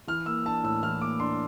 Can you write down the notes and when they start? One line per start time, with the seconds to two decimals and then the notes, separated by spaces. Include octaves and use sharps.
0.07 E3 F6
0.26 A#3 E6
0.45 D4 A5
0.63 A2 E6
0.83 E3 F6
1.01 A#3 D6
1.20 D4 C6